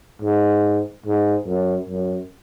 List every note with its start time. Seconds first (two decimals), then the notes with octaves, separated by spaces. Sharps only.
0.22 G#2
1.06 G#2
1.47 F#2
1.89 F#2